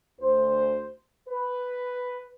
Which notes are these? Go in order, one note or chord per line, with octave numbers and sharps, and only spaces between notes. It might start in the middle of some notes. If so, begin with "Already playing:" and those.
D2 C5
B4